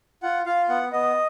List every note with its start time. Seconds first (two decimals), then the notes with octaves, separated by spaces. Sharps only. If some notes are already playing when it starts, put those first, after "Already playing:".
0.23 F4 F#5
0.46 F4 F5
0.69 B3 F#5
0.92 B3 D#5